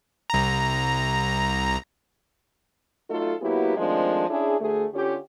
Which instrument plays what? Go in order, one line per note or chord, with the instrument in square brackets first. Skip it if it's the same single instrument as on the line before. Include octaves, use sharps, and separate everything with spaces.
[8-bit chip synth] C2 A#5
[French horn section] F#3 A3 D#4 F4 A4
F#3 A#3 B3 E4 F#4 G4
D#3 F3 G#3 A3 C4 D4
C#4 D4 E4 G#4
D2 A3 G#4
D3 C#4 F4 G4